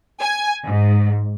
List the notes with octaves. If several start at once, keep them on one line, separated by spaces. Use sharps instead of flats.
G#5
G#2